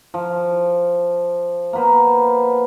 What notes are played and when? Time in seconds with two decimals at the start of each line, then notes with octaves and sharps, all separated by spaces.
0.14 F3
1.73 A#3 B3 B4 C5